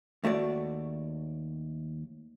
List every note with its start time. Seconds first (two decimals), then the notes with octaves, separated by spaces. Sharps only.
0.24 D#2 A3 F#4 D5